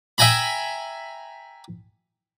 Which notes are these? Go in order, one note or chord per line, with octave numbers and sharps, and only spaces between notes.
E5 G5 G#5 A#5 B5